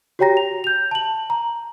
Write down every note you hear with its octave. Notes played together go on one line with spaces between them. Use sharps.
F#4 G4 C#5 G5 A#5 A#6
F7
G6 F7
A5 F#7
A#5